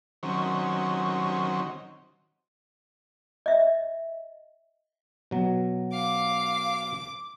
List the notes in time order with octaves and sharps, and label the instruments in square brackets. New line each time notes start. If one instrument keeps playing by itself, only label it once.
[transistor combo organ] D#3 F#3 C4 C#4
[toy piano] D#5 E5
[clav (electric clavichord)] B2 F#3
[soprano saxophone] F5 [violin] D6